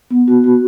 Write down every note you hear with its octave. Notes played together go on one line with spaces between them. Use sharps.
B3
F#4
F#4